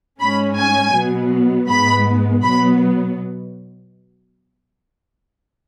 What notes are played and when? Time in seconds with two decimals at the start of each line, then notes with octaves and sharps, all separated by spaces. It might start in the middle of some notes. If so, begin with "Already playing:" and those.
0.20 G#2 G#3 C#4 B5
0.58 G#5
0.94 B2 F#3 B3
1.68 G#2 G#3 B3 B5
2.43 B2 F#3 B3 B5